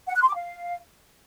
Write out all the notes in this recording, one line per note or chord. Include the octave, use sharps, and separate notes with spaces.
F#5
F#6
C6
D6
F5